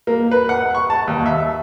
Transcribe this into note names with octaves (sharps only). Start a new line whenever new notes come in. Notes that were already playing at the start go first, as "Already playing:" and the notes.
A#3
B4
F#5
C#6
A5
D#2
E5